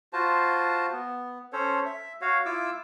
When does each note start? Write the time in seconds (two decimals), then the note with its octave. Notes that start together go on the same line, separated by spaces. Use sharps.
0.13 F4 F#4 C5 A5
0.92 B3
1.53 C#4 A4 C5 C#5
1.86 E5
2.21 F#4 C#5 F5
2.46 E4 F4 D6 E6